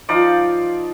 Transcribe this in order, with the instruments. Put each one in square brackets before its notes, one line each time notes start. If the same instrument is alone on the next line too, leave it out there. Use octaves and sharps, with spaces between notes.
[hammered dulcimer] F3 D#4 F4 D5